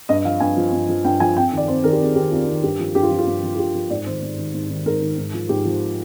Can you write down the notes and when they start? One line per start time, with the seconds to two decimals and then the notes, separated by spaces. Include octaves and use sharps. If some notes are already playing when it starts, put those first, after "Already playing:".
0.09 G2 D#5
0.25 F3 F5
0.40 G2 G#5
0.57 F3
0.73 G2
0.89 F3
1.05 G2 G5
1.20 F3 G#5
1.36 F2 G5
1.52 D#3
1.57 D5
1.68 F2 C5
1.84 D#3 A#4
1.92 G4
1.99 F2 G#4
2.16 D#3 G4
2.31 F2 F4
2.47 D#3
2.63 G2 G4
2.79 F3
2.95 G2 G4
3.03 F4
3.11 F3
3.18 F4
3.27 G2
3.43 F3
3.54 F4
3.59 G2 G4
3.75 F3
3.90 G#2 D5
4.06 D#3 C5
4.22 G#2
4.38 D#3
4.54 G#2
4.70 D#3
4.86 G#2 A#4
5.01 D#3
5.18 G#2
5.34 F3
5.49 G#2 G4
5.65 F3